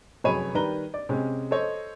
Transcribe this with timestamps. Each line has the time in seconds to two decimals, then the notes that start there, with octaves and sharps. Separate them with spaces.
0.24 F1 F#2 G#4 C#5 B5 D#7
0.54 D#3 G3 B4 A#5 G7
0.94 D5
1.09 C3 G#3 C#4
1.51 A4 C5 C#5 D#5